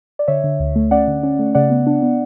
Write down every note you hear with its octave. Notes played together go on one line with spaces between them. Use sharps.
D5
D3 C#5 E5
D3
D2
A3
C#4 D5 F#5
D3
C#4
A3
C#3 D5 F#5
B3
D4
B3